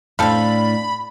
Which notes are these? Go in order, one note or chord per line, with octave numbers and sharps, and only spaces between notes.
A2 C4 D4 A4 F5 B5